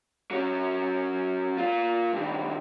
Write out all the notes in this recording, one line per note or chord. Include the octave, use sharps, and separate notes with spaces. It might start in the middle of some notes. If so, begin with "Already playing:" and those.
F#3 C#4
A#3 F4
G2 D#3